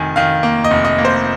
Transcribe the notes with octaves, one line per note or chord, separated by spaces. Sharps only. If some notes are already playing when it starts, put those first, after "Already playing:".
Already playing: F1 D#3 G#5
D#3 F5
A#3
D#5
F1
D#5
A#3
C5